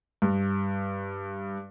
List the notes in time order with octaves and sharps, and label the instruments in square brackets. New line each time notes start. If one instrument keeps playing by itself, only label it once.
[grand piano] G2